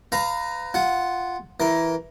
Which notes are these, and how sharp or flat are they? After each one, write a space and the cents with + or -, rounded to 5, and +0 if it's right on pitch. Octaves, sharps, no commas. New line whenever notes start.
B4 +30 F5 -5 A#5 +0
F4 -5 F#5 +0
E3 +0 A#4 +10